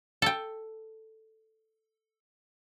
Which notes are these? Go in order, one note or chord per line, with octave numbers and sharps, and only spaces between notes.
A4 G5